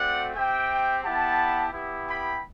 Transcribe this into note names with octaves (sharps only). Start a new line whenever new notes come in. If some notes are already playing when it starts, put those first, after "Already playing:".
Already playing: A3 C4 F#4 D5 F#5
C4 G4 E5 G5
B3 E4 G4 F#5 A5
B3 E4 G4
G5 B5